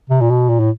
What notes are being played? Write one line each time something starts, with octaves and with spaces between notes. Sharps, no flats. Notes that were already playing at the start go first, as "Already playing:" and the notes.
C3
A#2
B2
A#2
A2